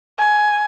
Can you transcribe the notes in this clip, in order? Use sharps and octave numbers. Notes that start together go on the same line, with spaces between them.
G#5